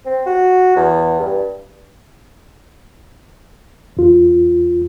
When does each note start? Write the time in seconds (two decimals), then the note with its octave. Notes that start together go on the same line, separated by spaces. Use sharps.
0.05 C4
0.26 F#4
0.76 E2
1.19 G2
3.97 E2 F4